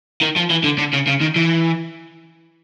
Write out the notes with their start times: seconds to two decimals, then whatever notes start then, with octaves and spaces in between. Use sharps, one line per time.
0.21 D#3
0.36 F3
0.50 E3
0.64 D3
0.79 D3
0.94 C#3
1.08 C#3
1.22 D#3
1.36 E3